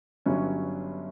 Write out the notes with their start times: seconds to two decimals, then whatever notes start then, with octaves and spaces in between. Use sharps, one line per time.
0.26 G1 G2 F#3 C#4